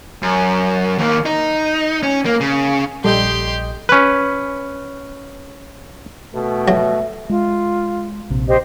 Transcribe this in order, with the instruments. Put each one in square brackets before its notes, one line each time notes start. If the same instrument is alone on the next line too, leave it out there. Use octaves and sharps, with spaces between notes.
[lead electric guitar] F#2
D#2 A#3
D#4
C#4
A#3
C#3
[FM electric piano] A#1 D#5 G6 [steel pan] G3 A4 [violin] G4 C6
[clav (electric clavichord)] C#4 B4
[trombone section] B2 A3
[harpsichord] F#3 [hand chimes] E5
[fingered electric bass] G#3 [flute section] F4
[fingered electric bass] A#1 C3
[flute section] G4 C5 D#5